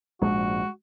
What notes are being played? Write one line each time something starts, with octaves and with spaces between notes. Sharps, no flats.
A#1 G#2 G#3 F#4